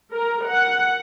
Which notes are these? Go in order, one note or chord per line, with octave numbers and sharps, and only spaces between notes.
A#4
F#5